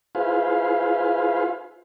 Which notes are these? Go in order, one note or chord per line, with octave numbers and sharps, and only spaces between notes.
E4 F4 G#4 B4 C5 F5